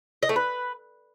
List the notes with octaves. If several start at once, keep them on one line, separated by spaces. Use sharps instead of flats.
D#5
A3
B4